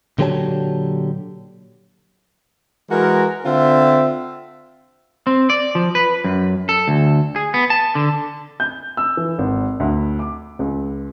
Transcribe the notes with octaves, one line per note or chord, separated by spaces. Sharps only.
A#2 D3 F#3 G4 C#5 A5
E3 G#3 F#4 A#4
D3 C4 F4 E5
C4
D5
F3
B4
F#2
A4
D2
G#4
B3
A5
D3
G6
E6
E3
G#1
D2
D6
C#2